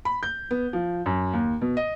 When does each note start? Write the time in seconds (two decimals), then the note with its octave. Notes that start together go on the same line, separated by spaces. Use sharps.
0.05 B5
0.23 G6
0.51 B3
0.73 F3
1.06 F#2
1.33 D#2
1.61 B2
1.77 D#5